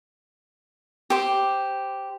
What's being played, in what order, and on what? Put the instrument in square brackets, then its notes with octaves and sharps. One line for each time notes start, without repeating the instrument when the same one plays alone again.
[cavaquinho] G4 C5